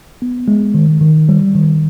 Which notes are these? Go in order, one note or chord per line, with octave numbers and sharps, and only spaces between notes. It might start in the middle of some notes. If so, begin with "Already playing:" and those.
B3
G#3
D#3
D#3
G3
D#3